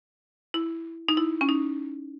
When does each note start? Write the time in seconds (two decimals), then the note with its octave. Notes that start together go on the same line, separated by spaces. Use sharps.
0.54 E4
1.09 D#4
1.17 E4
1.41 C#4
1.49 D#4